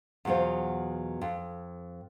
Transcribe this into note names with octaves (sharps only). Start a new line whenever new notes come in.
E2 B2 F#3 F4 C5
F2